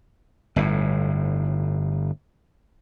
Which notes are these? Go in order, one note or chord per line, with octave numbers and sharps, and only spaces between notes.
G1 A2